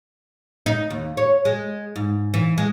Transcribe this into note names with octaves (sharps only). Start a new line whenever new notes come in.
D#4
D#2
C#5
G#3
G#2
E3
G#3